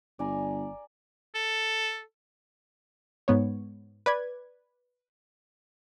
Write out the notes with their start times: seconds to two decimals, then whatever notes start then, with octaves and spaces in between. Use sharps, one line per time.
0.19 G1 D5 G#5 A#5
1.35 A4
3.28 G#2 B3 C#5
4.06 B4 D5 G#6